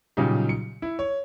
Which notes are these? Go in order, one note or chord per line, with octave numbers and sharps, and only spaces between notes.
A#2 C#3 F#3 G3 D#4 G4
C#7
E4
C#5